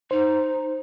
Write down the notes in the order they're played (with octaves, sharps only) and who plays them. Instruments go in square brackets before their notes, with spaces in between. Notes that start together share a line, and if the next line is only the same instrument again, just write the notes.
[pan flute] D#4 [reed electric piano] C5